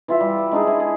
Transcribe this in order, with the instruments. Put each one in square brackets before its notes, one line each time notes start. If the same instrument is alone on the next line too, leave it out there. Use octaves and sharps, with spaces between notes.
[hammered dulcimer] E3 F4 E5
G3
D6
G#3 D4 D#4 G#4
E4
G#4